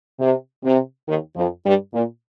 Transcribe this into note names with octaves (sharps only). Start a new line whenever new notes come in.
C3
C3
D#2 D#3
F2 F3
G2 G3
A#2